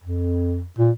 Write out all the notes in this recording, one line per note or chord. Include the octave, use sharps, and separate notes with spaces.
F2
A#2